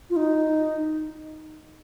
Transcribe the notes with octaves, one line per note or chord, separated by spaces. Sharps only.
F4
D#4